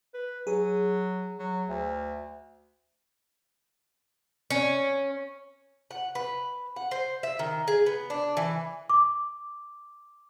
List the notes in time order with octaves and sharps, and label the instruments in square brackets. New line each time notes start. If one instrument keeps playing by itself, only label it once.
[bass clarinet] B4
[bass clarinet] F#3 [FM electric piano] G#4
[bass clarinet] F#3
D2
[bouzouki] C#4
F#5
B4
F#5
C5
E5
D#3
G#4
B3
D4
E3
[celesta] D6